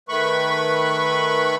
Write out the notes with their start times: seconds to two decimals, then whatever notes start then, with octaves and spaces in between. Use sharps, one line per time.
0.09 D#3 A3 B4 B5 C#6